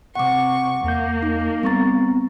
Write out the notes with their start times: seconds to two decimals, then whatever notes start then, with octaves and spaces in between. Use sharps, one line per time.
0.15 C3 F#5 C#6 D6
0.84 E2 A#3 G6
1.22 D#4
1.63 G3 B3 C4 A#5 C#6 A6